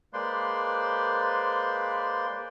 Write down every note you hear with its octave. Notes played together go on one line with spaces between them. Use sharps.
G#3 A#3 B4 C5 D5 C6